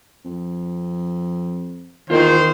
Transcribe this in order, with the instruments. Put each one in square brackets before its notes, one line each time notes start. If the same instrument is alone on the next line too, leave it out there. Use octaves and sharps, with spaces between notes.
[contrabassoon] F2
[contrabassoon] E2 [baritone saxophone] D#3 [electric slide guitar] F4 A#4 [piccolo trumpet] C5